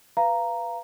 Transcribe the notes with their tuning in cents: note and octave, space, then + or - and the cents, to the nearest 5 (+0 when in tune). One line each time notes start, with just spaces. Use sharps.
B4 +0 F5 -20 A#5 +0